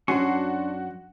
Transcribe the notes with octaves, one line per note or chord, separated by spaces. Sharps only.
F#2 C#4 D4 F#4 G#5 C6 C#6